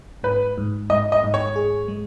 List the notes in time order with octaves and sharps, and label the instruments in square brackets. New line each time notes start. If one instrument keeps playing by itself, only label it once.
[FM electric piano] G#2 [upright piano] B4
[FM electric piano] G#2
[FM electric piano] G#2 [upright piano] D#5
[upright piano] D#5
[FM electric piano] G#2
[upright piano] C#5
[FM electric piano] G#4
G#3